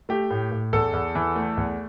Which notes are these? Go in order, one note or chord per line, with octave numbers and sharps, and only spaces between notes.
A3 G4
A2
A2
E2 A4
E2
E3
A3
E2